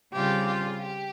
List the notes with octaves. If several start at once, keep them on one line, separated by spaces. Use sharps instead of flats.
C#3 G3 C4 F4 G4
F4
G4